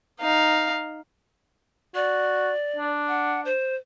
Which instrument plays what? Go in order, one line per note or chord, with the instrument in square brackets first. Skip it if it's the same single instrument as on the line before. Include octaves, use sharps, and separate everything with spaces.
[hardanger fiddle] D#4 F5
[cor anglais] F#4 [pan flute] D5
[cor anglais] D4
[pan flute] F#5
C5